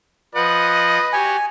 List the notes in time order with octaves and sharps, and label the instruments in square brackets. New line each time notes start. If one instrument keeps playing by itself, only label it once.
[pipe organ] F3 F#5 [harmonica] B4 [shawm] D#5
[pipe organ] F#4 G4 C#5 [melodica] G#5